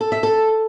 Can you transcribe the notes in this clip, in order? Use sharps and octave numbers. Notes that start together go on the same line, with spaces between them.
A4
E5
A4